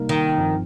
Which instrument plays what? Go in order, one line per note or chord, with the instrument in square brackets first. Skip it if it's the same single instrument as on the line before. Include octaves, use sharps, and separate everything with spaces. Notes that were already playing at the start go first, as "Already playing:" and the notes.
Already playing: [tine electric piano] C3 G3 A#3 D#4 A#4
[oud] D#3
[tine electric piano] G2 F3 C4